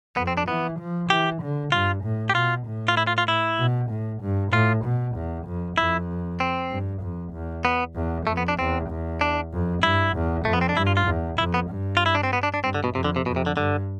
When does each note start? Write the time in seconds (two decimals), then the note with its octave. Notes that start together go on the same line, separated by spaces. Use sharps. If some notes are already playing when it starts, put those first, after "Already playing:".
0.17 F2 B3
0.27 C4
0.37 D4
0.48 E3 B3
0.79 F3
1.10 E3 G4
1.42 D3
1.72 G2 F4
2.03 A2
2.30 G4
2.35 B2 F4
2.66 A2
2.88 F4
2.97 E4
3.07 F4
3.18 F4
3.28 E4
3.59 B2
3.90 A2
4.22 G2
4.52 A2 F4
4.85 B2
5.16 E2
5.46 F2
5.77 F2 E4
6.40 C4
6.71 G2
7.02 F2
7.33 E2
7.65 B3
7.96 E2
8.27 F2 A3
8.37 B3
8.48 D4
8.59 E2 C4
8.89 E2
9.21 D4
9.52 F2
9.83 G2 E4
10.15 E2
10.45 F2 A3
10.53 B3
10.61 C4
10.69 D4
10.76 G2 E4
10.87 F4
10.97 F4
11.07 E2
11.38 F2 E4
11.54 B3
11.70 G2
11.97 F4
12.06 E4
12.15 D4
12.23 C4
12.33 B3
12.43 D4
12.54 D4
12.64 G2 C4
12.75 D3
12.84 B2
12.95 F2 C3
13.04 D3
13.16 C3
13.26 F2 B2
13.36 C3
13.46 D3
13.57 G2 D3